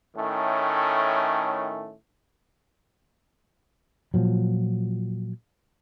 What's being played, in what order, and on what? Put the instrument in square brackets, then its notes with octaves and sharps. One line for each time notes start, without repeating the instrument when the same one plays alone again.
[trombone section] A2 D#3 A3 C#4
[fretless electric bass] A#2 F3 F#3